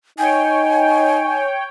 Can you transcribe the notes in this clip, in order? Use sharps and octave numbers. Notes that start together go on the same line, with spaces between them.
D#4 C#5 G5 G#5